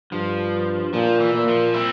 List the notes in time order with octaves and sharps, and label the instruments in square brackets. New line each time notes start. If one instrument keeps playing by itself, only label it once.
[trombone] G2 [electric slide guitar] F3
[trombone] A#2 [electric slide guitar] F3
[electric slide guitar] E3
[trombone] A#2
[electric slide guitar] F3
C4 E4